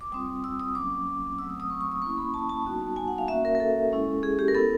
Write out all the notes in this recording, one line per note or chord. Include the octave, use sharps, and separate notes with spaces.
D6
G3 C4 F4 D#6
E6
D#6
F#3 A#3 C#4 D6
F#3 A3 C4 E6
D#6
D#6
C#6
C#6
D#6
A#3 C#4 E4 C#6
B5
A5
A5
G3 B3 D#4 F#4
G#5
F#5
F5
A#3 C#4 F#4 E5
A#4
A#4
A4
G#3 C#4 E4
G#4
G4
A#4
B3 E4 A4